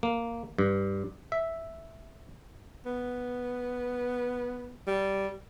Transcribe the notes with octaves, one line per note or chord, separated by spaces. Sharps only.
A#3
G2
E5
B3
G3